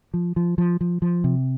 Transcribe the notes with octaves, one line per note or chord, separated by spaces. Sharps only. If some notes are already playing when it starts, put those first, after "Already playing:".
F3
F3
F3
F3
F3
C3